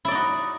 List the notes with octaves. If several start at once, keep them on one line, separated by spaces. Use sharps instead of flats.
D#4 E4 F#4 D5